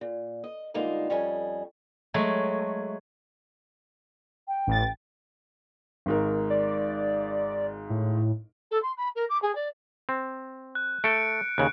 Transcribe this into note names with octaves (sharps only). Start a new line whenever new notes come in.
A#2
D#5
D3 G3 G#3 A#3 D#4 F4
F2 G3 C#4 D#5 G#5
F#3 G#3 A3
G5
A1 A6
G#1 G#2 A#4
D5
A2
A4
C6
B5
A#4
D6
G#4
D5
C4
F#6
A3 A4 C#7 D7
D#2 C#3 F#6